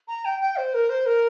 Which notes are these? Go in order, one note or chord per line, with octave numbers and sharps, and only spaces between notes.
A#5
G5
G5
C5
A#4
C5
A#4